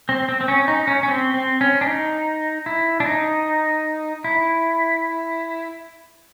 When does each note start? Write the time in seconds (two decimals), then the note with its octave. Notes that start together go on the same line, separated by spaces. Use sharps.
0.09 C4
0.29 C4
0.41 C4
0.48 C#4
0.68 D#4
0.87 C#4
1.03 C#4
1.08 C4
1.34 C4
1.61 C#4
1.81 D4
1.87 D#4
2.66 E4
3.00 D4
3.06 D#4
4.24 E4